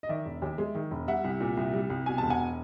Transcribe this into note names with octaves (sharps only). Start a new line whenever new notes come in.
D#5
D#3 D5 E5
E1
D#2
G#3
D#3
E1
G3 E5 F#5
C2
A#2
C2
G3
C2
B2 G#5
E1 A5
F#5 G#5